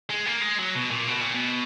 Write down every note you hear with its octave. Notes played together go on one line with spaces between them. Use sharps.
G#3
A#3
G#3
F#3
B2
A#2
B2
A#2
B2